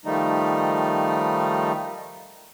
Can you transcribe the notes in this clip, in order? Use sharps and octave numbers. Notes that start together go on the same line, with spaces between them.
D#3 F3 G3 A3 D#4